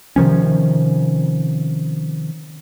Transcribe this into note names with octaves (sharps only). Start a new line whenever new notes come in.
C3 D#3 F3 C#4